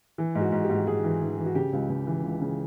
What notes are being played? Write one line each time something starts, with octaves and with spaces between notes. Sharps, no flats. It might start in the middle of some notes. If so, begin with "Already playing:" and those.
E3
G#2
F#4
G#2
G4
G#2
G#2 G#4
E3
E3
E3
F#4
C#3 G4
C#2
C#2
E3
C#2
C#3